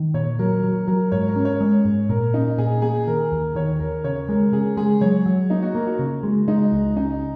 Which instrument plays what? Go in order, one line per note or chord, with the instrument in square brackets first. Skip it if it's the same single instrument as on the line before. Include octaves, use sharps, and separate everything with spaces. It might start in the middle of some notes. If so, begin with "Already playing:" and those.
Already playing: [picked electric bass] D#3
[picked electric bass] A#2 [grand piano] C#5
[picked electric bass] F#3 [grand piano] A#4
[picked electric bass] F#3
[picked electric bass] F#3 [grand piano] A#4
[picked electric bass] G#2 [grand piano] C#5
[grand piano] A#4
[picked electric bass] C#4
[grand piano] C#5
[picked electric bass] G#3
G#2
[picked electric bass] A#2 [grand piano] A#4
[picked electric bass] C#4 [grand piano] D#4
[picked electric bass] A#2 [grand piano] G#4
[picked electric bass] A#3 [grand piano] G#4
[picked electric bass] D#3 [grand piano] A#4
[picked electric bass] D#2
[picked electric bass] D#3 [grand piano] C#5
[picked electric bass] D#2 [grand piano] A#4
[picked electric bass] C#3 [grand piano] C#5
[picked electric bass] G#3 [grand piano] A#4
[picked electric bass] C#3 [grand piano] G#4
[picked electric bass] G#3 [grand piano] G#4
[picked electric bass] F#3 [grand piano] C#5
[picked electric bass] F#3
[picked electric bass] A#3 [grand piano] D#4
[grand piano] F#4
[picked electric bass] A#3 [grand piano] A#4
[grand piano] F#4
[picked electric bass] C#3
G#3
[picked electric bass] G#3 [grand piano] D#4
[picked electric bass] C#2
[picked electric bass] C#4 [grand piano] D#4